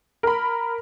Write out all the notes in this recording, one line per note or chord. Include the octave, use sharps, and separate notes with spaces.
A#4 B5